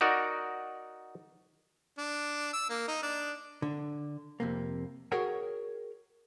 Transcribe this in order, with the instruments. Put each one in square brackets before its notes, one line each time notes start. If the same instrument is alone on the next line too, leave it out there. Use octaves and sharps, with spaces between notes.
[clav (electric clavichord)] D#4 F#4 A#4 D5
[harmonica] D4
E6
A#3
D#4
D4
[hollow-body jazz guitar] D3
F2 C3 A#3
F#4 G#4 A#4 C#5 F#5 G5